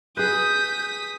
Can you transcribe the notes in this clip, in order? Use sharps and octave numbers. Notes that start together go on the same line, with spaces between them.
G#4 B4 D#6 G6 B6